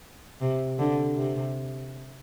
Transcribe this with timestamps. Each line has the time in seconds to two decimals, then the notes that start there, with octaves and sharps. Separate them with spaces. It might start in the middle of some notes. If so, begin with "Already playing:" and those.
0.41 C3
0.79 D3
1.17 C3